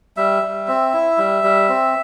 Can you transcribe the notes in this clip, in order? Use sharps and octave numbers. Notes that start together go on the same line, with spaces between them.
G3 E5
G3
C4
E4
G3
G3
C4